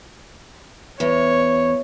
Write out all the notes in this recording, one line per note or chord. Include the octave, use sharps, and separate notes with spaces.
E2 C#5